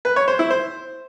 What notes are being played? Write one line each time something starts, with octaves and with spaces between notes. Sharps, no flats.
B4
C#5
C5
E4
C5